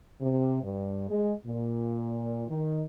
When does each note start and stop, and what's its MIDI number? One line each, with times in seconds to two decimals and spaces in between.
0.21 0.63 48
0.64 1.09 43
1.10 1.33 56
1.47 2.45 46
2.49 2.84 51